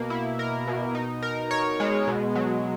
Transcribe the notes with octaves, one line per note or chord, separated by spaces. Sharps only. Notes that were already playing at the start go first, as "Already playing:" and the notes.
Already playing: B2 A#3
E4
A#4
B2
D#4
A#4
C#5
G#3
B2
F#3